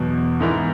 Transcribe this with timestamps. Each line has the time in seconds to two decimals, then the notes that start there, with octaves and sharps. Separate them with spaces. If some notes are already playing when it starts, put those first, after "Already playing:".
Already playing: E2 B2 F#3
0.40 G#2 E3 B3 E4 A#4